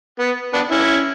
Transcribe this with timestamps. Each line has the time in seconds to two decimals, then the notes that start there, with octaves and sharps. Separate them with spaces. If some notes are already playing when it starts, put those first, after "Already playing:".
0.19 B3
0.54 B3 D4
0.71 C#4 E4